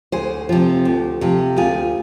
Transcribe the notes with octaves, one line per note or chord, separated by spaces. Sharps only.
D2 G#4 C5
C3 F3
D2
C3 F3
D2 F4 G#4